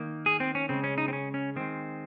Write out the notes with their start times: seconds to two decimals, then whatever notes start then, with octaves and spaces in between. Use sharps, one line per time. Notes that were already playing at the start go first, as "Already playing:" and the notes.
Already playing: D#3 A#3
0.26 G#4
0.40 C4
0.55 C#4
0.69 C#3 G#3 C4
0.84 C#4
0.98 D#4
1.08 C4
1.13 C#4
1.34 C#4
1.56 D#3 G#3 C4